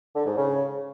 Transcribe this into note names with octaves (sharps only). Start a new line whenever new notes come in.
D3
G#2
C#3